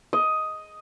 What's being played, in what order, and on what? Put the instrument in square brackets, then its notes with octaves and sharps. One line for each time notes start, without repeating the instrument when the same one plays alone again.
[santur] D#5